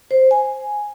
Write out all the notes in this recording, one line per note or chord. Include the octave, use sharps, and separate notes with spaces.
C5
G#5